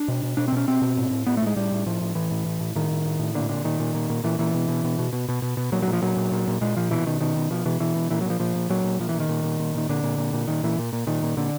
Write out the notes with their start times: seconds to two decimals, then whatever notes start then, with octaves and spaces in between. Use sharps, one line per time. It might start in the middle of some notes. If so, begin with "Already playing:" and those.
Already playing: D4
0.08 B2
0.23 B2
0.37 B2 D4
0.48 C4
0.52 B2 C#4
0.67 B2 C4
0.82 B2
0.97 A2
1.11 A2
1.27 A2 B3
1.37 A3
1.42 A2 G#3
1.56 A2 G3
1.72 A2
1.86 A2 F3
2.01 A2
2.15 A2 E3
2.31 A2
2.46 A2
2.60 A2
2.75 A2 D#3
2.91 A2
3.05 A2
3.19 A2
3.35 A#2 D3
3.49 A#2 D3
3.64 A#2 D#3
3.80 A#2
3.94 A#2
4.10 A#2
4.24 A#2 E3
4.39 A#2 E3
4.54 B2
4.69 B2
4.84 B2
4.99 B2
5.13 B2
5.29 B2
5.42 B2
5.57 B2
5.72 A#2 F#3
5.82 F#3
5.87 A#2
5.93 F3
6.02 A#2 F#3
6.17 A#2
6.32 A#2
6.47 A#2
6.61 A#2 G#3
6.77 A#2 F3
6.91 B2 E3
7.06 B2 D#3
7.21 B2 D#3
7.36 B2
7.50 B2 F3
7.65 B2 E3
7.80 B2 E3
7.96 B2
8.11 A#2 E3
8.21 F#3
8.25 A#2 F3
8.40 A#2 F3
8.56 A#2
8.70 A#2 F#3
8.84 A#2
9.00 A#2 F3
9.09 E3
9.14 A#2
9.20 D#3
9.29 A#2
9.44 A#2
9.59 A#2
9.74 A#2 D#3
9.89 A#2 D3
10.03 A#2
10.18 A#2
10.33 A#2
10.48 A#2 D#3
10.63 A#2 E3
10.79 A#2
10.93 A#2
11.07 A#2 D#3
11.23 A#2
11.37 A#2 D3